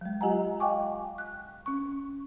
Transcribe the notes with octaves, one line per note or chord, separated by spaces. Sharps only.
F#3 G#3
F4 G4 D#5 F#5 G#5 A#5
D#5 F5 G5 G#5 C#6 D6
F#6
C#4 C#6